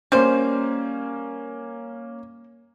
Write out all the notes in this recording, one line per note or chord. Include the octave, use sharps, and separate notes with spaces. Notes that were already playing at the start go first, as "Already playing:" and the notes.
G3 A#3 C#4 C5